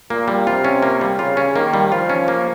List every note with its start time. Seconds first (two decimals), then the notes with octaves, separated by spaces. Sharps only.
0.10 A#2 A#3
0.28 G3
0.46 C3 F4
0.64 C#4
0.83 A#3
1.01 G3
1.19 C#3 F4
1.37 C#4
1.55 D#3 A#3
1.74 G3
1.91 F3 F4
2.10 C#4
2.28 A#3